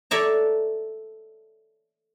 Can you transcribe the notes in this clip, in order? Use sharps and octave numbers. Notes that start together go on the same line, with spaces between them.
A4 C#5 D5 E5 A5 A#5